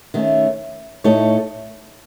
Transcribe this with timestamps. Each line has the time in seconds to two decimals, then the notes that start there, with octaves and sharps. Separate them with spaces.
0.14 D#3 A3 C#4
1.04 A2 A3 D#4 A4 C#5